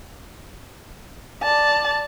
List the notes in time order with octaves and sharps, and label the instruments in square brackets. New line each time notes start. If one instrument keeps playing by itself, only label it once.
[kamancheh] D5 A5